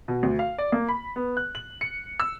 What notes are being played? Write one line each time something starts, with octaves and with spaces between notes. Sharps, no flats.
B2
D2
F5
D5
A#3
B5
B3
F#6
F#7
C#7
E6